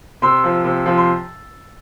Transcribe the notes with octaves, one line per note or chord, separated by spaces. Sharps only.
C3 C6 E6
F3
C3
F3
C6